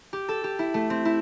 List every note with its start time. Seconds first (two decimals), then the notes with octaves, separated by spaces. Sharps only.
0.13 G4
0.28 A4
0.44 G4
0.59 E4
0.74 A3
0.90 C4
1.05 E4